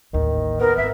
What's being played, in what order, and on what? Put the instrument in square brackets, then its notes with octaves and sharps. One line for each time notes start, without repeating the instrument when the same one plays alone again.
[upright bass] A1 D#2 [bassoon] D#3
[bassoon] B3 [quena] A#4
[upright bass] G#1 [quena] E5